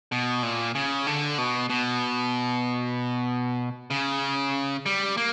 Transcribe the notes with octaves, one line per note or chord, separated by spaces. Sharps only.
B2
A#2
C#3
D3
B2
B2
C#3
G3
A#3